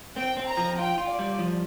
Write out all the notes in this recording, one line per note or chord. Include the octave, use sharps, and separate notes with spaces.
C4 G5
C4
A#5
F3
F4 G5
F4
D5
G3
F3